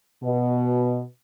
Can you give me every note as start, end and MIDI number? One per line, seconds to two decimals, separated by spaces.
0.23 1.01 47